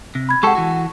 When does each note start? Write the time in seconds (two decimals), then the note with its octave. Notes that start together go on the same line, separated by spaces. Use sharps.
0.15 C3
0.29 B5 G#6
0.43 G#3 G4 A4 F#5 C#6
0.55 E3 F#4